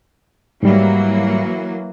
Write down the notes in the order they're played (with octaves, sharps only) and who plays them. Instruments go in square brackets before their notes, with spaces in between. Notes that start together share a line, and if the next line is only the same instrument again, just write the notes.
[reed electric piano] G#2 G3 [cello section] E3 F#3 A#3